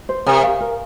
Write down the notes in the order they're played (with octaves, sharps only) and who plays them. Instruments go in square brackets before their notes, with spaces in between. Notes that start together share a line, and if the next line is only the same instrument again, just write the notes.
[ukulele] C5
[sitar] C3 [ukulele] A#4
[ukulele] F5
A#4